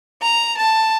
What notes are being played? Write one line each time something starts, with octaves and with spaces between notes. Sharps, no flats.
A#5
A5